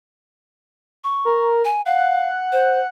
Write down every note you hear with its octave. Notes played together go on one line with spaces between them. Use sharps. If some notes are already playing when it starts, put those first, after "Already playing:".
C#6
A#4
G#5
F5 F#5
C5